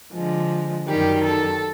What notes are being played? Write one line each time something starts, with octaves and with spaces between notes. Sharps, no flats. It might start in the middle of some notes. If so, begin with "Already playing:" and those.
D3 F3 G#3
F#2 D#3 G3 G4
A4